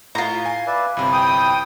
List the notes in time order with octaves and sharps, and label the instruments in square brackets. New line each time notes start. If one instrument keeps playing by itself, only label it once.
[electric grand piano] A2 [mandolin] F4 A#5
[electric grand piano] G#5
[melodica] B4 D5 E5
[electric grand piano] G1 C3 [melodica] E4
[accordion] G5 D#6